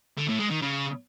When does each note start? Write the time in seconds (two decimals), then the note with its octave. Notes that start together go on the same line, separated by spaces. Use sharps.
0.17 D3
0.28 A2
0.39 G#3
0.50 D#3
0.61 C#3